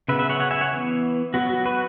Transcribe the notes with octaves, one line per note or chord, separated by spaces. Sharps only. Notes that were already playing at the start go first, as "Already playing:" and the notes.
C#3 F#3 B3 B4 E5
B4 E5
C#5 F#5
C#5 F#5
E5 G#5
C#5 F#5
E3 B3
F#3 B3 F#4
F#4
F#4 B4